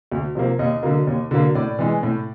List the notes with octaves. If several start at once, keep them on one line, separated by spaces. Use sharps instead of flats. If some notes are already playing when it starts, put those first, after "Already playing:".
D2
C3 F3 A#3
D#2 D#5
D3 F#3 A#3
D#2
D3 F#3 A#3
A2 D5
E3 G#3
A2